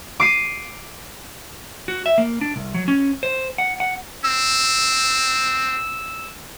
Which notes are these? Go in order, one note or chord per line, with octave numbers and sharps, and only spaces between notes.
D6 C7 D#7
F#4
E5
A#3
D4
C2
F#3
C#4
C5
F#5
F#5
C4 E6